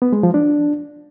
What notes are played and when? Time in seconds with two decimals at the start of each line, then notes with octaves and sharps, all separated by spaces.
0.02 B3
0.13 G#3
0.23 F3
0.34 D4